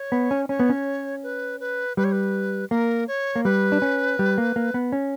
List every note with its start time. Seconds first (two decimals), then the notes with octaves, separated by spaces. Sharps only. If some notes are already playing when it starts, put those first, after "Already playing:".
Already playing: C#5
0.12 B3
0.31 C#4
0.49 C#4 C#5
0.60 B3
0.69 C#4
1.23 B4
1.60 B4
1.97 G3 B4
2.04 C#5
2.12 B4
2.71 A#3 A#4
3.08 C#5
3.36 A#3
3.44 G3 B4
3.72 D4
3.82 C#4
4.19 G3
4.38 A#3
4.56 A#3
4.74 B3
4.92 C#4